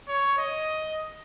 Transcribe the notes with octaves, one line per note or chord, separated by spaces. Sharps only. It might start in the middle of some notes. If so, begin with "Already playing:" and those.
C#5
D#5